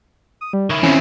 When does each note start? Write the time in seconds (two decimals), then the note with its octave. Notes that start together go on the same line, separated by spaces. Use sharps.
0.41 D#6
0.53 G3
0.70 D#3 E4 C#5
0.83 E3 C4 C#4 E5